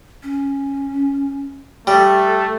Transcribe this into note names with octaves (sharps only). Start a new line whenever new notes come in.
C#4
G3 A3 A4